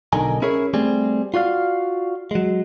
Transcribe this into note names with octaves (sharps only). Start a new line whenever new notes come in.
B1 D3 D#3 D#4 G#5 A#5
C#4 E4 G#4 A#4 C#5
G3 A3 C4 G#4
F4 F#4 D5 F5
F#3 G#3